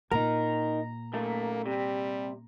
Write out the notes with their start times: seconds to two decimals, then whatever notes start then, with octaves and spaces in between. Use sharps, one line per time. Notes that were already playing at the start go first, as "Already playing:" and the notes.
0.11 A#2 D#4 A#4 A#5
1.13 F#2 A3 A#3
1.66 C3 G3